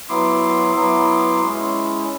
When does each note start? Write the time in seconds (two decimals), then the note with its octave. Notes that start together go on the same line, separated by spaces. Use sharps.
0.09 F#3 B3 E4 C6 D6
0.76 F#3 B3 E4
1.43 G#3 C#4 E4